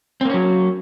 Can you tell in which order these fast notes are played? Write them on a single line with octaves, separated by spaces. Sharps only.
C4 A#3 C#4 F#3